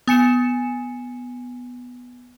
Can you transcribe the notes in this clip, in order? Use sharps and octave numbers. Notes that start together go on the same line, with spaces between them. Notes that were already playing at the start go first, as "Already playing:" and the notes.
B3 G#5 C#7 E7